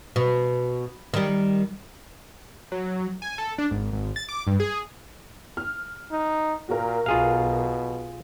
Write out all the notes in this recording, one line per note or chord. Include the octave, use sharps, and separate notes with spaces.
B2
D#3 G3
F#3
G#5
A4
D4
G#1
G#1
A6
D6
G2
G#4
F6
D#4
A#2 F#4 A#4
B1 B2 F4 G#4 F5